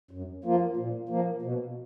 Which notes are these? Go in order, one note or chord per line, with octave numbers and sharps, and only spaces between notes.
F#2
F3 A#3 F4
A#2
F3 A#3
B2